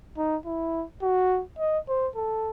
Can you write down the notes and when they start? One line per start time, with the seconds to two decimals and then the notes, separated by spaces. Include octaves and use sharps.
0.17 D#4
0.45 E4
1.02 F#4
1.59 D#5
1.88 C5
2.16 A4